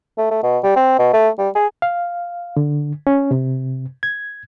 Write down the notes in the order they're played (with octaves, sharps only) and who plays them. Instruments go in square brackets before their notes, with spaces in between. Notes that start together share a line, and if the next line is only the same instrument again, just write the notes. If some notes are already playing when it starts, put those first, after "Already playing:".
[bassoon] A3
A3
B2
G3
C4
B2
A3
G3
G#4
[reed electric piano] F5
D3
C#4
C3
G#6